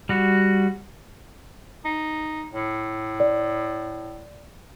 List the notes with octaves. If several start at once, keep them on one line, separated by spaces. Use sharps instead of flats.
G3 F#4
D#4
A2
D5